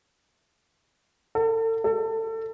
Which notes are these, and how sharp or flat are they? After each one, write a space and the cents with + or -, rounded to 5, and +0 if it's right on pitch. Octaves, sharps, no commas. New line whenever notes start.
A4 +40
A4 +30